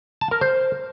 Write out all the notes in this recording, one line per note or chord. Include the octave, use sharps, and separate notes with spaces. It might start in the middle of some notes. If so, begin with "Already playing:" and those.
A5
A#4
C5